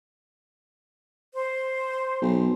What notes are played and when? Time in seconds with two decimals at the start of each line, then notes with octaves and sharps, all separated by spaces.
1.34 C5
2.21 B1